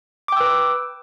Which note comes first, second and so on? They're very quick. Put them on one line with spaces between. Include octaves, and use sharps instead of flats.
D6 G5 E6 B4